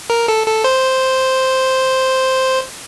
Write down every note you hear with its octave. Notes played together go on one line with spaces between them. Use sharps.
A#4
A4
A4
C5